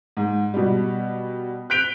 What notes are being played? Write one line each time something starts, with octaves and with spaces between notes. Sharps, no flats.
G#2
B2 G3
F#6 G6 B6 D7 F7 G7